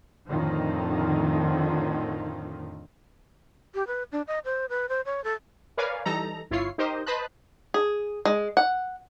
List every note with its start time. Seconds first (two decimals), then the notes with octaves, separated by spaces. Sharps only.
0.28 F2 A2 D3 D#3 F3
3.74 G4
3.87 B4
4.12 D4
4.27 D#5
4.45 C5
4.69 B4
4.89 C5
5.05 C#5
5.24 A4
5.77 A#4 B4 C#5 D5 F5 G#5
6.05 E3 G3 D#4 A4 A#5
6.51 G1 E4 F4 C#5 C7
6.78 D#4 G4 A#4 C5 D#5
7.06 B4 C5 D#5 A5 B5 F#6
7.74 G#4
8.25 G#3
8.57 F#5